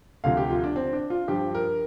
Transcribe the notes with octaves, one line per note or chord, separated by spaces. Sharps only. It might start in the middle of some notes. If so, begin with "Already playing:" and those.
D2 C3 F3 F5
G4
F4
D4
C4
D4
F4
G2 F3 G4
A#4